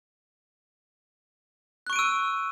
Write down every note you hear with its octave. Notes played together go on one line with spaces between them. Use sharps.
C#6 E6 F#6 D7 D#7